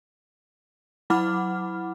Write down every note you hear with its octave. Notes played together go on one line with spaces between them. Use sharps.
F#3 E4 F#5 B5 D6 F6